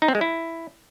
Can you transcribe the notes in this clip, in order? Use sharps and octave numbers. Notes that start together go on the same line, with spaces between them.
D#4
C4
G#3
E4